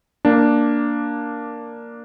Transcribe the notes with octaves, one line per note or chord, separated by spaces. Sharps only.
A#3 D4